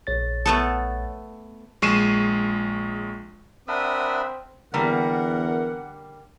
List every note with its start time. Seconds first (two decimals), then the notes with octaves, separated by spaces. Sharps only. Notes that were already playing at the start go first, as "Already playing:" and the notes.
0.07 A#1 C#5 A6
0.46 A3 B3 A4
1.82 A#1 G#3 C#6 C7 D#7 E7
3.68 C4 D4 A#4 E5 F#5 B5 D#6
4.74 E2 D3 G3 A#3 A#4 F#5